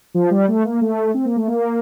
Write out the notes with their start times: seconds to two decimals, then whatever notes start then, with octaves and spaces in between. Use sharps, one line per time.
0.14 F3
0.31 G3
0.48 A3
0.65 A#3
0.81 A3
1.14 C4
1.25 A#3
1.36 A3
1.48 A#3